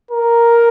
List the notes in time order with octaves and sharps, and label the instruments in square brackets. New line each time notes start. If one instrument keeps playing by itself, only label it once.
[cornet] A#4